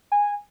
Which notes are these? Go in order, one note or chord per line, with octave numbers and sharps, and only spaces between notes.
G#5